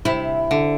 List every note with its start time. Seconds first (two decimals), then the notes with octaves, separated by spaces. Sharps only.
0.05 C3 E4
0.51 D3